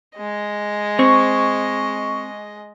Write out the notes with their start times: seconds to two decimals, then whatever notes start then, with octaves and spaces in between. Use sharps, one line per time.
0.17 G#3 D#5
0.99 C4 C#6